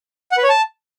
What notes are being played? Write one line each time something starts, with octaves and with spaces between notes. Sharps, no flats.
F#5
B4
C#5
A5